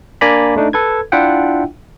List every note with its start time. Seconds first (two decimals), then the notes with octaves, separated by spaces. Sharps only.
0.21 A#3 D4 D5 G#5 A#5 B5
0.56 A3 D4 D#4
0.73 A4 B4 G#6
1.12 D4 E4 F4 E5 F#5 G5